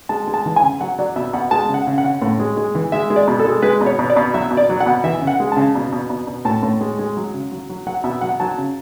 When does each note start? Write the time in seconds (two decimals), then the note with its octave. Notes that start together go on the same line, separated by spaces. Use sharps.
0.09 G#3 A5
0.27 G#3
0.34 A5
0.46 E3
0.56 G#5
0.63 C#3
0.81 F#3 F#5
0.98 F#3 D5
1.16 B2 E5
1.33 B2 F#5
1.51 G#3 A5
1.69 C#3
1.74 F#5
1.87 C#3
1.98 F#5
2.04 C#3
2.22 A2
2.39 G#3
2.57 G#3
2.75 E3
2.92 G#3 E5
3.10 G#3
3.16 D5
3.28 B2
3.39 A4
3.45 G#3
3.62 G#3 B4
3.81 B2
3.86 C#5
3.99 B2
4.10 D5
4.16 B2
4.34 F#3 E5
4.51 B2
4.57 D5
4.70 F#3
4.80 F#5
4.86 B2
5.04 E3 E5
5.21 C#3
5.27 F#5
5.40 G#3
5.52 C#3 A5
5.75 B2
5.92 B2
6.10 B2
6.27 B2
6.45 A2 A5
6.63 A2
6.81 G#3
6.99 G#3
7.17 F#3
7.34 C#3
7.52 F#3
7.70 F#3
7.87 F#3 F#5
8.04 B2 E5
8.21 F#3 F#5
8.40 F#3 A5
8.58 C#3